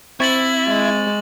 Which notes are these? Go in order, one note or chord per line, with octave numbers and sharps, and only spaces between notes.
C4 E4 C#6 A6 F#7
G#3